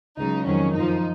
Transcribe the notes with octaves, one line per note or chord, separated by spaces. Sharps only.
C#2 C#3 F#3 D#4
F2 D#3 F#3 C#4
F#2 F3 D#4